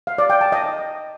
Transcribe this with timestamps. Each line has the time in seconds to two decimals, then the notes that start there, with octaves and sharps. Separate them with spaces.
0.07 F5
0.18 D5
0.30 G5
0.41 A5
0.52 D#5